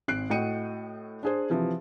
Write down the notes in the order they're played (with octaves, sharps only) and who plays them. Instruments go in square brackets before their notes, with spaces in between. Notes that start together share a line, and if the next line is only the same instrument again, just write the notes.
[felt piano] G#1 F#6 C7 D7
A2 F#4 D#5 G5 C#7 D#7
D4 G#4 C5
C3 E3 F3